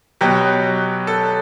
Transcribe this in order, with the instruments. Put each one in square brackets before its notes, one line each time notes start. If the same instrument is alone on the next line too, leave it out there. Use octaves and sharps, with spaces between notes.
[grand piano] B2 F#3 G4
A4